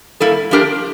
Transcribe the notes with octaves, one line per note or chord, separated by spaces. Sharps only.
A2 G3 A#3 E4 A4
F3 A3 D4 G4 A#4